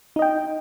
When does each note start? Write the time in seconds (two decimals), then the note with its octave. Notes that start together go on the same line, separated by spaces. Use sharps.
0.16 D#4
0.19 D#5
0.22 G5